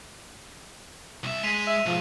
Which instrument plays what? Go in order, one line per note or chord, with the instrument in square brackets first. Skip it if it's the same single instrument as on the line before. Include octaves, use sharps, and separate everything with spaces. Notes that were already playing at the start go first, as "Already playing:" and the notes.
[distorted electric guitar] C2 E5
[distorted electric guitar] G#3 [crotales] B6 D#7 F7
[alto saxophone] E5
[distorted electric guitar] B1 G#2 [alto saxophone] F3